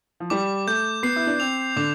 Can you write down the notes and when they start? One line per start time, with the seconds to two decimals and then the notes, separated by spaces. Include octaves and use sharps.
0.20 F3
0.30 G3 D6
0.67 A3 G6
1.03 B3 C7
1.16 E4
1.27 D4
1.40 C4 F7
1.76 D3 D6